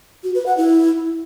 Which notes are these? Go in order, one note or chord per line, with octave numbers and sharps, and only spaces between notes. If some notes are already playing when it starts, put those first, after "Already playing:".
F#4
B4
F#5
E4